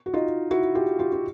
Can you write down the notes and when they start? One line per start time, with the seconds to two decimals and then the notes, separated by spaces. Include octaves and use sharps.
0.06 F#4
0.14 D#4 F4
0.51 E4 F#4
0.75 F4 G4
0.99 F4 G4
1.13 F4